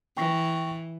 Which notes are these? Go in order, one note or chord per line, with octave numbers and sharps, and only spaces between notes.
E3 G5 C#6 A#6